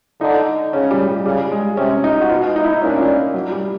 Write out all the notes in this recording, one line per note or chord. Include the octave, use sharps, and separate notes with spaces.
D3 D#4
C#3 C#4
G3
G3
C#3 G3
G#3
C3 C#4
D#4
F#4
B2 F4
D#4
E4
D#4
A#2 C#4
D4
C#4
A#3
F#3
G3